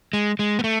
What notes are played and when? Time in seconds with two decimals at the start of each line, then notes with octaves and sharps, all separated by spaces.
0.13 G#3
0.39 G#3
0.59 B3
0.64 A3